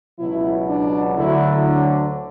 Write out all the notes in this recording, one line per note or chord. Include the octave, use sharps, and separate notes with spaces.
C#2 B2 F#3 E4
D4
D2 D3 F#3 E4
D4